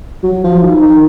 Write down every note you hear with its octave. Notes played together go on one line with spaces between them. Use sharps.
F#3
F3
D#3
D#3